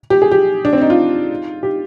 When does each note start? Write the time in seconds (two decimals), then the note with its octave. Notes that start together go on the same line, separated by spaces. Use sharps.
0.10 G4
0.22 G#4
0.31 G4
0.65 D4
0.73 C4
0.81 D#4
0.90 F4
1.63 G4